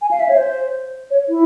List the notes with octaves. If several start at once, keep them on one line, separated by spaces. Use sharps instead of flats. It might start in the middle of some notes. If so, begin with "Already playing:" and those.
G#5
F5
E5
C#5
C5
C#5
E4